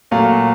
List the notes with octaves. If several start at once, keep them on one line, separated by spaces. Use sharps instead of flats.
A#2 F#3 A3 F5